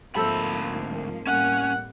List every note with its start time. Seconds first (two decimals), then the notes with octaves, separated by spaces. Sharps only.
0.15 D2 G#2 F3 A#3 C4 A4 E5 B5
1.27 A2 G3 A#3 C#4 F#5